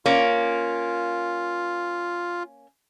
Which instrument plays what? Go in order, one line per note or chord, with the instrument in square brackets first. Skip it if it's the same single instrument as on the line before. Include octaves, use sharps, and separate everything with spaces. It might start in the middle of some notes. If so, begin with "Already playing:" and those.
[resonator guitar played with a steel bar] A#3 C#4 [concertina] F4